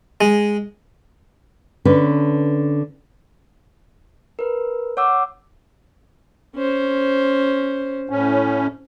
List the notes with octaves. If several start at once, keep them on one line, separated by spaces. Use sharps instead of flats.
G#3
D3 C#4 B4
A#4 B4
C#5 F#5 D6 E6
C#4 C5
A2 C#4